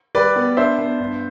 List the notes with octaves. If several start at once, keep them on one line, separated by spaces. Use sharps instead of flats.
G3 B4 D5
B3
D4 C5 E5
B3
G2